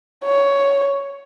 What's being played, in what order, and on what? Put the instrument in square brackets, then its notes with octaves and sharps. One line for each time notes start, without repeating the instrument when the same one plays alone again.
[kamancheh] C#5